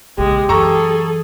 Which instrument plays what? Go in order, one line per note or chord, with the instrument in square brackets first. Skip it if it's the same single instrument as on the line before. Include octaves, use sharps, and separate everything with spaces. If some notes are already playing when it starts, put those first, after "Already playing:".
[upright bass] A#1 C#3 [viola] G#3 [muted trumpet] G4
[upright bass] F#2 E3 [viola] G#4 A4 [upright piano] A#5 C#6 E6